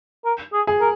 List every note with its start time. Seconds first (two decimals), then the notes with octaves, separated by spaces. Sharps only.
0.25 A#4
0.53 G#4
0.67 G#4
0.80 A#4